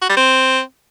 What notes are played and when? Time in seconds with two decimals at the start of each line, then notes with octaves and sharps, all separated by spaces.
0.02 F#4
0.09 G3
0.17 C4